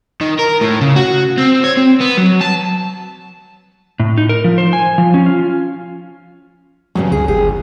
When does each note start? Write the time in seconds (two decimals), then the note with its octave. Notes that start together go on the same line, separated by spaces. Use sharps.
0.21 D#3
0.39 A#4
0.61 A2
0.81 C#3
0.96 F#4
1.38 C4
1.64 C#5
1.77 C4
2.01 B3
2.18 F#3
2.41 A5
4.00 A2
4.18 D#4
4.29 A#4
4.44 F3
4.58 C5
4.73 G#5
4.98 F3
5.14 C#4
5.26 F4
6.95 E2 G2 C#3 F#3
7.12 D2 G#4
7.28 G1 G4 G#4